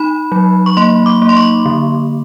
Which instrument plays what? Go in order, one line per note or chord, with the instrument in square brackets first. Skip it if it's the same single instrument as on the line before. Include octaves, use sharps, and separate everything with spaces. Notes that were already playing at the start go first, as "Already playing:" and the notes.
Already playing: [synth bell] D#4 B5
F#3
C#6
A#3 C6
D6
A#3
C6
C#6
D3